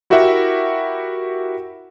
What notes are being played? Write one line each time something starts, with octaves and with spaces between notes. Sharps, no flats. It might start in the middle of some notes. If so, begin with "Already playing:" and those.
E4 F#4 G4 A#4 E5 F#5